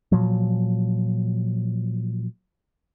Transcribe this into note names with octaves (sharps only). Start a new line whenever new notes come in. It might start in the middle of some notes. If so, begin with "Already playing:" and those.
A#2 F3 F#3